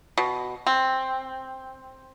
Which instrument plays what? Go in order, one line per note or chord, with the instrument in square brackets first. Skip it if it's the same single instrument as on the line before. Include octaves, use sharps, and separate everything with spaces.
[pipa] B2
C4